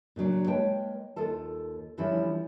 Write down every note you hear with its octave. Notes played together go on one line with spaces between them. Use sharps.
A#2 C#3 F#3 D4
G#3 A#3 B4 C#5 G5 A5
D#2 F4 A4 A5
D3 E3 F3 G3 C#4 E4